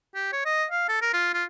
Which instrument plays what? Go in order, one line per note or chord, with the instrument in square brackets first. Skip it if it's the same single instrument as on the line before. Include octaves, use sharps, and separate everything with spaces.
[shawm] G4
C#5
D#5
F5
A4
A#4
F4
F4